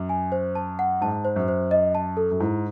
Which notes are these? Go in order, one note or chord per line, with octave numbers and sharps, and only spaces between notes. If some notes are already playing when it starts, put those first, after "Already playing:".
Already playing: F#2
G#5
C5
A5
F#5
G#2 A5
C5
F#2
C5
D#5
A5
A4
F#2
G#2 E4